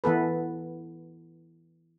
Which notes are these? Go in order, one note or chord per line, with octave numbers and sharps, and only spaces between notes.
E3 B3 A4 B4